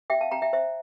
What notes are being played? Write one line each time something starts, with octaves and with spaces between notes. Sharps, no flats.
E5 G5
F5 A5
G5 A#5
E5 G5
C5 E5